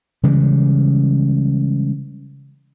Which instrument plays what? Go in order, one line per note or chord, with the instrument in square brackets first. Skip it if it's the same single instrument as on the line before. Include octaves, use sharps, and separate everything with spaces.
[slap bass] C#3 E3 G3 G#3